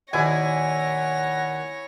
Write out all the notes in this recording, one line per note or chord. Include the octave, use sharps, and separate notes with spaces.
D#2 A#2 F3 E4 C#5 F#5 G#5 A#6